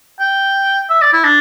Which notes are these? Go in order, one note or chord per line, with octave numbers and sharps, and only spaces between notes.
G5
E5
D5
E4
D4